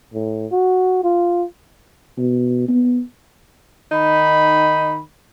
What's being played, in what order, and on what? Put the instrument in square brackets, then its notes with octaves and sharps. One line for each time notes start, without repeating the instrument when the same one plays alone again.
[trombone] A2
F#4
F4
[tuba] B2
B3
[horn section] D#3 D#4 B5